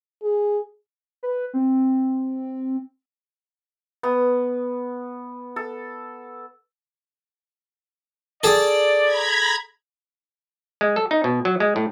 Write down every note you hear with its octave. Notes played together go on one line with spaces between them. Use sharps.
G#4
B4
C4
B3
A4
G#4 A4 D5
A#5 B5 G#6
G#3
A4
D#4
B2
F#3
G#3
A2